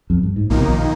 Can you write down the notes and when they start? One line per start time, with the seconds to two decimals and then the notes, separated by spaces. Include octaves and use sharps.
0.10 F2
0.23 G2
0.36 G#2
0.50 A#1 D#2 A#2 D#3 A#3 D#4
0.60 C3
0.68 A#1 A#2